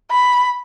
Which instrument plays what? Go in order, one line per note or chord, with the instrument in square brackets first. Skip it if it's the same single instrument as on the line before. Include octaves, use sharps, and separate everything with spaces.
[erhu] B5